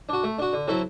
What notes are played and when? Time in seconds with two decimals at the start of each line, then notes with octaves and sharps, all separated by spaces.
0.09 D4 F#4
0.24 A3
0.38 D4 F#4
0.53 D3
0.68 F#3 C4 E4 A4